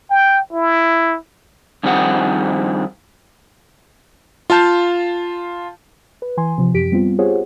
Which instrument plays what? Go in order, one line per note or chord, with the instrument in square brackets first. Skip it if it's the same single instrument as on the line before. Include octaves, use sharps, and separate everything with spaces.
[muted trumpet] G5
E4
[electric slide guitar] G2 D#3 F3 C4 G#4 F#5
[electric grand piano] F4 F5 A5 G6
[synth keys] B4
E3 G#5 C6
C3 F3
F#2 G4 B6 D7
G3 B3 C4 F4
F4 G4 G#4 C5 C#5 F#5